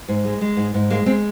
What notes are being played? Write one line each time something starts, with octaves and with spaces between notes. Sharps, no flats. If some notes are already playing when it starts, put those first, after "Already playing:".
G#2
G#3
G#3
G#2
G#2
G#3 A#3
G#3 C4